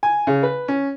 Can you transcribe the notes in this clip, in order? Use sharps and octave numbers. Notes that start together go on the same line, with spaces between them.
G#5
C#3
B4
C#4